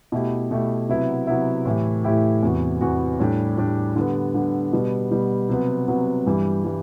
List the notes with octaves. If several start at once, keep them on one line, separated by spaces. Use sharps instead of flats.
B2 A3 E4 G4
B2 A3 E4 G4
C3 F#3 B3 E4
C3 F#3 B3 E4
A2 E3 A3 E4 G4
A2 E3 A3 E4 G4
E2 C3 E3 B3 F#4
E2 C3 E3 B3 F#4
A2 G3 D4 G4
A2 G3 D4 G4
D3 G3 B3
D3 G3 B3
B2 G3 B3
B2 G3 B3
C3 F#3 B3
C3 F#3 B3
G2 E3 G3
E3 G3